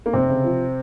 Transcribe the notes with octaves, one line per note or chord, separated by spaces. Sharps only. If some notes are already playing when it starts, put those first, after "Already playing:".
A#3
F1 C3 C4
C#3
F3